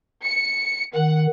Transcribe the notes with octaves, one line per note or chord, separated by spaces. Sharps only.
C#7
D#3 F#5